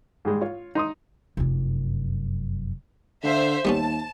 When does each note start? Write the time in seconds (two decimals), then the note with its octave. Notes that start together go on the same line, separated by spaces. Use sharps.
0.25 G#2 G3 G#3
0.41 F4 C#5
0.75 D#4 C6 D#6
1.37 F1 F#2
3.23 D3 C5 E5 F5
3.65 D#2 G3 B3 C#4 A5